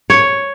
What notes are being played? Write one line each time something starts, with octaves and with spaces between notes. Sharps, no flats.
C#5